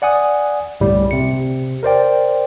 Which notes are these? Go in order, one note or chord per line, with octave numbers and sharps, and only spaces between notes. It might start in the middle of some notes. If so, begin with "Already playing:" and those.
D5 F#5 G#5 D#6
G1 C2 A2 G3
C3 C#7
A#4 C5 D5 G5